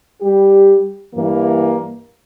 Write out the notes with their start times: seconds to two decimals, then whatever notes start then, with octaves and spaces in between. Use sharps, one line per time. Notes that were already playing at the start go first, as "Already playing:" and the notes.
0.22 G3 G4
1.13 G2 E3 A#3